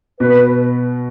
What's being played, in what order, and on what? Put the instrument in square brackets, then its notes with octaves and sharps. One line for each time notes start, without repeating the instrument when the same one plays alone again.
[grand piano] B2 [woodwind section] B4